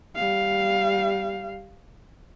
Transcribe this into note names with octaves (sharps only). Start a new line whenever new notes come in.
G3 F5